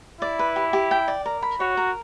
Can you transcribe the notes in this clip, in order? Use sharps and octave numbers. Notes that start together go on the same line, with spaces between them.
E4 D5
B4
G4
G4
G5
D5
A#4
B5
F#4 C#5
A#4